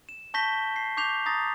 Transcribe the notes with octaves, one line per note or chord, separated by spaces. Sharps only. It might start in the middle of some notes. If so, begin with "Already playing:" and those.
E7
A5 C#6 G6 A#6 B6 G7
C7
C#6 D6 G6 C7 F7
A#5 D#6 A6 A#6